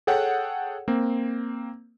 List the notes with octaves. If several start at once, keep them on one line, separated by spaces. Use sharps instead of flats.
G#4 A4 C#5 F#5 G5
A#3 C4